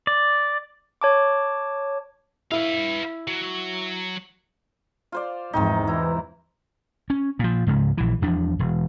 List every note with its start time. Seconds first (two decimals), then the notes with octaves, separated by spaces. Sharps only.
0.07 D5
1.01 C#5 A5 D6
2.52 E4 B4 F5
3.28 F#3
5.12 F4 C5 D5
5.53 E2 G#2 C3 D#3 F3 D#4
5.87 E3 E4 A#5
7.10 C#4
7.39 A#2 F3
7.67 C#2 G#2 C#3
7.98 A#1 E3
8.22 E2 F3 D4
8.59 E1